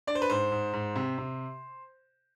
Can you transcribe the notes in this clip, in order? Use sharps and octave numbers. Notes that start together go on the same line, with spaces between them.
D4 D5
C5
B4
G#2 C5
G#2
G#2
C3
C3